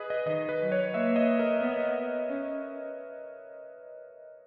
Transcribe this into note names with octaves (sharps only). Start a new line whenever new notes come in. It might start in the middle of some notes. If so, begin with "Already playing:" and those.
Already playing: G#4 B4 D#5
D#5
D#3 D#5
B4
F#3
C#5
A#3 E5
D#5
A#4
B3
C#4